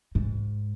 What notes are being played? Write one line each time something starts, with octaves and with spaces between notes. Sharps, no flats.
G#2